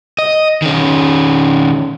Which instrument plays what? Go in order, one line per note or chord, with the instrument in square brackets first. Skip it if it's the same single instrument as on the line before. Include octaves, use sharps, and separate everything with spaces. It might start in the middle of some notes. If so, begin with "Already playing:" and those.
[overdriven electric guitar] D#5
D#3 C#4